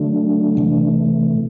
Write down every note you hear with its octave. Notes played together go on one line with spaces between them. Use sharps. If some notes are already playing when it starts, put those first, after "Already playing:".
Already playing: D3 F#3 A3 D4
C3 E3 A3